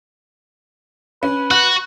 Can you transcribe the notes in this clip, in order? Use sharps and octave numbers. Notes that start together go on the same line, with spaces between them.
C#4 B4
F#4 F#6